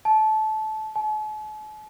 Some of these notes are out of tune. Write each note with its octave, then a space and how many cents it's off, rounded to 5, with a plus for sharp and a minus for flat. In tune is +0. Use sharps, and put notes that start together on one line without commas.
A5 -20
A5 -45